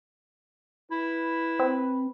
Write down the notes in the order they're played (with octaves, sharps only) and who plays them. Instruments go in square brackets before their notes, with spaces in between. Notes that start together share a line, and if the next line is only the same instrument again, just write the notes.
[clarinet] E4 [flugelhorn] B4
[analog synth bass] C4